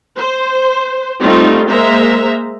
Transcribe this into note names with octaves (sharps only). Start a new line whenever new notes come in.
C5
G3 A3 C4 D#4 F4
G#3 A#3 C5 E5 A#5